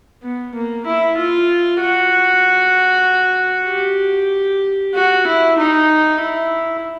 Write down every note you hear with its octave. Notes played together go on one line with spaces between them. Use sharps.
B3
A#3
E4
F4
F#4
G4
F#4
E4
D#4
E4